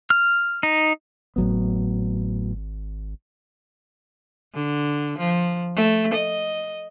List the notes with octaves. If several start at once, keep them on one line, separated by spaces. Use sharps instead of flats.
F6
D#4
G#1 A2 F#3 B3
D3
F3
A3
D#5